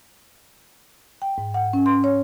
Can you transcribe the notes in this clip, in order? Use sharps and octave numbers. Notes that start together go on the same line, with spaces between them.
G5
G#2
F#5
C#4
C6
C#5